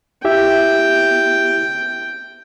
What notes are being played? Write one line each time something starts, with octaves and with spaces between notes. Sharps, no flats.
E4 G4 E5 G5